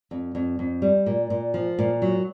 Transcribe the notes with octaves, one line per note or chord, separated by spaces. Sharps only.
F2
F2
F2
G3
A#2
A#2
F3
A#2
F#3